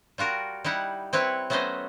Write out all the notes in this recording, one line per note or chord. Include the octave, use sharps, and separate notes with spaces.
G3 F4 F#4 A#4
G3 D#4 E4 F#5
C4 E4 B4 C#5
F#3 A3 B3 C#4 C5 D#5